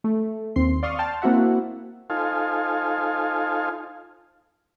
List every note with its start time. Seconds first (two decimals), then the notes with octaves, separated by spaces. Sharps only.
0.04 A3
0.56 D#2 C4 C6 C7
0.83 D5 F5 C6 C#6 D#6 F6
0.99 G5 A5 C6 F6
1.22 A#3 C4 E4 F#4 E5 F#5
2.10 D#4 F4 A4 C5 F5 G#5